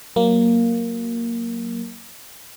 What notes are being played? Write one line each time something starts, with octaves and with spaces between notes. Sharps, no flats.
F#3 A#3